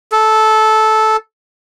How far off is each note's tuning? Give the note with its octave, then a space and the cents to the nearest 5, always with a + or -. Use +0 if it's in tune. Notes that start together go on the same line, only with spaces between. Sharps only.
A4 -15